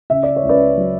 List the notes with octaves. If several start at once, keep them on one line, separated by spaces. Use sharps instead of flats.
C#3 E5
D5
C#5
C#2
B4 D5
F#3